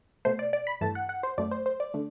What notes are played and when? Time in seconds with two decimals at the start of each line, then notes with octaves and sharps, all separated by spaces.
0.25 B2 A3 C5
0.39 D5
0.53 D5
0.67 B5
0.81 G2 E3 A3 A5
0.95 F#5
1.09 F#5
1.23 C5
1.38 F#2 F#3 A3 D5
1.51 C5
1.66 C5
1.80 D5
1.94 D3 A3